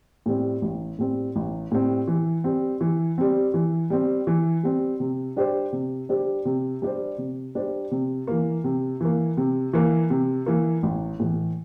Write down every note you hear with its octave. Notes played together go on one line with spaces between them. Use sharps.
A2 G3 C4
A1
A2 G3 C4
A1
A2 G3 C4
E3
G3 C4
E3
G3 C4
E3
G3 C4
E3
G3 C4
C3
G3 D4 G4 C5
C3
G3 D4 G4 C5
C3
G3 D4 G4 C5
C3
G3 D4 G4 C5
C3
E3 A#3
C3
E3 A#3
C3
E3 A#3
C3
E3 A#3
A1
A2 E3